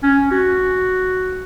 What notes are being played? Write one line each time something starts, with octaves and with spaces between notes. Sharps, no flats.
C#4
F#4